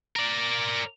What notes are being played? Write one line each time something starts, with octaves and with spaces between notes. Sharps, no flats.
A#4 D5